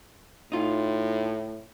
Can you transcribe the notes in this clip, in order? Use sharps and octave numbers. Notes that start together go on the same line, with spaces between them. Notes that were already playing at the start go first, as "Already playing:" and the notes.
A2 D#4 F4